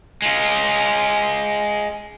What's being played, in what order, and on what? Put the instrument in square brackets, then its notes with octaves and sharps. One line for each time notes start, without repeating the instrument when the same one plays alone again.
[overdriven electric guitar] G#3 F4